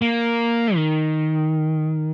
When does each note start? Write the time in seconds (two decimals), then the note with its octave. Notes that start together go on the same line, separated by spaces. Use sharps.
0.02 A#3
0.75 D#3